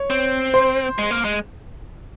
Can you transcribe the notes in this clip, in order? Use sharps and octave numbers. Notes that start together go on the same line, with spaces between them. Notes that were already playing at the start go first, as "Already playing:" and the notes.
Already playing: C#5
C4
C5
G#3
A#3
G#3